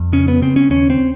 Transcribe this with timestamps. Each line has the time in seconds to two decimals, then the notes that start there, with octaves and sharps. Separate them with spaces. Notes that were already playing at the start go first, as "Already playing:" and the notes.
Already playing: F2
0.13 C#3 C#4
0.28 B3
0.42 C#3 C4
0.56 C#4
0.70 D#2 C#4
0.90 C4